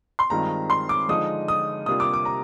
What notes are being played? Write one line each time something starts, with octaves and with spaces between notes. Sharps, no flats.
C6
G2 D#3 G#3 C4 F4 A#5
C6
D6
D3 F3 G#3 D#4 D#6
D#6
C3 G3 A#3 D4 F4 D#6
D6
D6
A#5